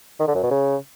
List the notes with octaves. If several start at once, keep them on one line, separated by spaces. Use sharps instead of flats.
D#3
D3
F#2
B2
C#3